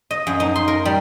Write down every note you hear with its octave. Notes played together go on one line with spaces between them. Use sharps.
D#5
F#2
D#4
C6
A#4
G3